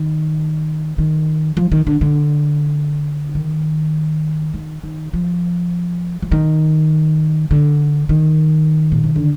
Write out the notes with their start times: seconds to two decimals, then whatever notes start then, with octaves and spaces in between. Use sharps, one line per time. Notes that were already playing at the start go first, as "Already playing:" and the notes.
Already playing: D#3
0.98 D#3
1.57 F3
1.72 D#3
1.87 D3
2.01 D3
3.35 D#3
4.54 D#3
4.84 D#3
5.13 F3
6.22 F3
6.32 D#3
7.51 D3
8.09 D#3
8.92 A#2
9.04 C3
9.16 D3